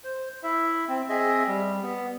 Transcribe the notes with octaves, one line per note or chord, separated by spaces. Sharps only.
C5
E4 E5
C4
C4 G#4 D#5 E5
G3
B3